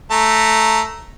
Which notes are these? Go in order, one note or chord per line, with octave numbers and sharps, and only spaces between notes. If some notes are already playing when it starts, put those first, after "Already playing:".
A3 A#5